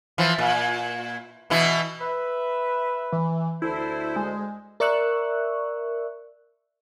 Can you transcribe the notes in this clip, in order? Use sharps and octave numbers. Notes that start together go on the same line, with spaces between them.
E3 F3
A#2
B2 E3 E4
B4 E5
E3
D2 E4 A4 C5
G#3
A#4 D5 E5 C#6 E6 F#6